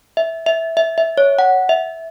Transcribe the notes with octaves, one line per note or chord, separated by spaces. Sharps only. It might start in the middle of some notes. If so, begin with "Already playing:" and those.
E5
E5
E5
E5
C#5
F#5
E5